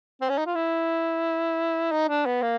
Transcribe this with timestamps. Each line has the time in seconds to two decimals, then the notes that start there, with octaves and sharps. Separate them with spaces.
0.21 C4
0.29 C#4
0.38 D#4
0.47 F4
0.55 E4
1.92 D#4
2.08 D4
2.26 B3
2.42 A#3